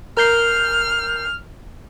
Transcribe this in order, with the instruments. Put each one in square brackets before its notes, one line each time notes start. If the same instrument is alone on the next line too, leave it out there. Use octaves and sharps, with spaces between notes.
[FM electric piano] A#4 G6 C7 [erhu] F6